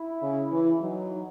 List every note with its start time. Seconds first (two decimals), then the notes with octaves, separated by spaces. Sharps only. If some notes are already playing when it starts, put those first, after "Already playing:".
Already playing: E4
0.22 C#3
0.52 E3
0.81 F#3 D#4